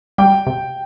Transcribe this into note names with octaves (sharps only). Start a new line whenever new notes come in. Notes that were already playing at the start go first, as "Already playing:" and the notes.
G3 G5
C3